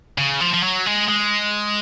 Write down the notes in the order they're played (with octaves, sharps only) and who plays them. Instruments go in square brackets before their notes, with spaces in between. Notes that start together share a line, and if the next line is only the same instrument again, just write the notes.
[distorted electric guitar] C#3
F3
F3
F#3
G#3
G#3